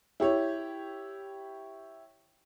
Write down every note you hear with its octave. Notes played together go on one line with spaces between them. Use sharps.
E4 G4 C#5